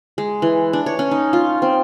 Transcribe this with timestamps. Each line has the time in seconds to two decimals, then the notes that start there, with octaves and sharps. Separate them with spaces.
0.18 G#3
0.42 E3
0.73 D4
0.86 C#5
0.99 C#4
1.11 D#4
1.33 F4
1.62 C4